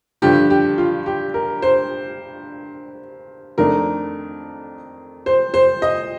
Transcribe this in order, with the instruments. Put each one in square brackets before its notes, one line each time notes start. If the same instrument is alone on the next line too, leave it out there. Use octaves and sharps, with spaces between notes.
[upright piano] G2 D3 F3 G4
G4
F4
G4
A#4
C5
F2 D#3 A3 D4 A#4
C5
C5
D#5